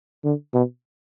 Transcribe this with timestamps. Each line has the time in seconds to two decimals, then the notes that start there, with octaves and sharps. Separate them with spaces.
0.24 D3
0.54 B2